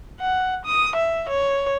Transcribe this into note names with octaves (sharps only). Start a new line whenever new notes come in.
F#5
D#6
E5
C#5